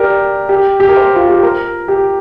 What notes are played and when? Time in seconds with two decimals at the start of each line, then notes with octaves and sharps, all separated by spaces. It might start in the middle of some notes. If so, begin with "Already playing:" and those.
Already playing: G4 A#4 D5
0.49 G4
0.80 G4
0.89 A#4
0.97 C5
1.16 F4
1.29 G4
1.43 A#4
1.88 G4